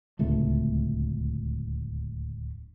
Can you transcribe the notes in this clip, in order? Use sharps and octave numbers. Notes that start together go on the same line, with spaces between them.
D1 C#2 A3